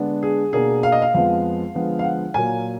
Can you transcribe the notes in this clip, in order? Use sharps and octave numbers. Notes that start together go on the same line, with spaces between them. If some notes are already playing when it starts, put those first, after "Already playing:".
Already playing: D3 G#3 B3 D4
G#4
B2 A#3 D4 G#4
F5
D#5
F5
F2 F3 G#3 B3 F5
D3 F3 G#3 B3
F5
F#5
A#2 F#3 A#3 G#5